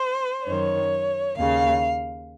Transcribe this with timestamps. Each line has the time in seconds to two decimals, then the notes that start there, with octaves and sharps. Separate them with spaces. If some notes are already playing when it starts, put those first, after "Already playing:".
Already playing: C5
0.46 F#2 D#3 C#5
1.37 D#2 C#3 F5